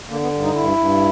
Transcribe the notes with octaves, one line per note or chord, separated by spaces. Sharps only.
D3 A#3
B3
G2
D#4
G2 E4
G2